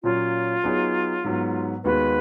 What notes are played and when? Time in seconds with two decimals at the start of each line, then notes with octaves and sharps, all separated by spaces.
0.03 A#2 F#3 C#4 F4
0.64 F#3 B3 D#4 G#4 C#5
1.24 G#2 F#3 B3
1.84 D#2 D#3 G#3 B3 F#4 B4